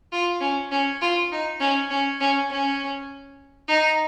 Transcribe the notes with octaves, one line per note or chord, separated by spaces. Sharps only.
F4
C#4
C#4
F4
D#4
C#4
C#4
C#4
C#4
D#4